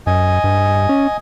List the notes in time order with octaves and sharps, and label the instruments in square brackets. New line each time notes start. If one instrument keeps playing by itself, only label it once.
[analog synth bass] F#2 [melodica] D#5 G#5
[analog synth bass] G2
C#4